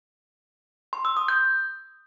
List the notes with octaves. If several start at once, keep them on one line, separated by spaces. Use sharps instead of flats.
C6
E6
D#6
G6